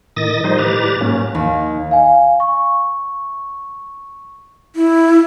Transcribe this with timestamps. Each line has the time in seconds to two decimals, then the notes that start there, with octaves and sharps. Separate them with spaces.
0.16 A2 D#3 D#5 D#6 A6 A#6
0.44 D#3 F3 G3 D#4 C5 D#5
0.58 A2 G4 B4 A#5 A6
1.01 G#2 F#3 A#3 C#4
1.35 D#2
1.91 F5 G#5
2.40 C#6
4.76 E4